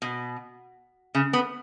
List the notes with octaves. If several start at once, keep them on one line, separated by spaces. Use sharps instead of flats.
B2
C#3
B3